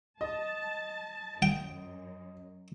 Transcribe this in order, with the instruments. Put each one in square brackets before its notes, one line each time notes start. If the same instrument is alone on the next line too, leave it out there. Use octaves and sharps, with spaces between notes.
[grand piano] D#5 [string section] A5
[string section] F#2 [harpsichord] G5